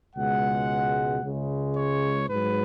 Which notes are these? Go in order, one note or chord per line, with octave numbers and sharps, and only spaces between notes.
C#2 B2 G#3 F#5
C#2 C#3 G#3
C#5
G#2 F#3 B4